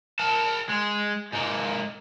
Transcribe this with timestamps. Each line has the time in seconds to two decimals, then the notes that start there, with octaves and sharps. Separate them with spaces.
0.19 A#4 A5
0.69 G#3
1.32 G#2 A#3